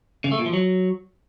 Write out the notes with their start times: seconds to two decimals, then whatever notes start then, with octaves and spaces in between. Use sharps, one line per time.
0.24 C#3
0.31 A3
0.39 A#2
0.46 F3
0.53 F#3